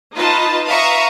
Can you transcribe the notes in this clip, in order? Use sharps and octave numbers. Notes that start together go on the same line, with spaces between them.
D#4 F4 B4 D#5 A5
B4 E5 F5 A#5 C#6 D#6